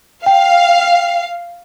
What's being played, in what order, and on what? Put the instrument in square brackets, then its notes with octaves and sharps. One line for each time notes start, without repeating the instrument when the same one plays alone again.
[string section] F5 [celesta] G5